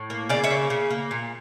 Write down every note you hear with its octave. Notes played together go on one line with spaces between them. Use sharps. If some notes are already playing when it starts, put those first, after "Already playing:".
Already playing: A2
A#3
C#3 D5 F5
C#5 E5
A#3
C#3
A#3
A#2